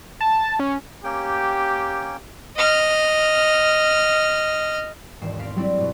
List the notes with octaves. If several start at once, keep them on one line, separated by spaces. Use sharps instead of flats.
A5
C#4
A#3 C#4 G4 G5
D#5 F6
E1 D#2 G#2 C7 E7
C4 F5 B6 D7
F#3 G3 A3 C4 D4 E4
G2 B2